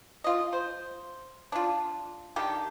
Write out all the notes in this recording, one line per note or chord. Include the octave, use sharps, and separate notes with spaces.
F4 D#5
C5
D4 F4
D3 D#3 G4